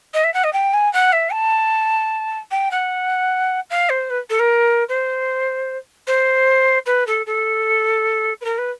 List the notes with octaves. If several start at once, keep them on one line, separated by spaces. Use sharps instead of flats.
D#5
E5
F#5
D#5
G5
G#5
F#5
E5
A5
G5
F#5
F5
C5
B4
A4
A#4
C5
C5
B4
A4
A4
B4
A#4
B4